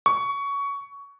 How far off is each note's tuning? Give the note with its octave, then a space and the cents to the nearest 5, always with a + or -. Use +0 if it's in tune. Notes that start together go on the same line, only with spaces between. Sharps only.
C#6 +20